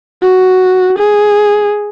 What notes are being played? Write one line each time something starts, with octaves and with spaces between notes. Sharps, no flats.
F#4
G#4